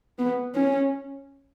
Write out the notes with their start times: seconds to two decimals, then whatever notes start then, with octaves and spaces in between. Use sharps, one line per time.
0.19 B3
0.55 C#4